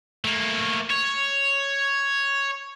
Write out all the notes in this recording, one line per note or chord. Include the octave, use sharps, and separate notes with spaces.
A3 A#3
C#5